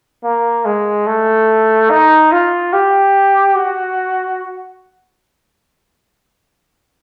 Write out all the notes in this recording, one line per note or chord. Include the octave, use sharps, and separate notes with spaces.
A#3
G#3
A3
D#4
F4
G4
F#4